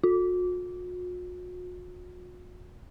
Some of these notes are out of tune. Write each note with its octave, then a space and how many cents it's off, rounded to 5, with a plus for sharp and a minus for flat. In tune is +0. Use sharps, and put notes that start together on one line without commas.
F#4 -45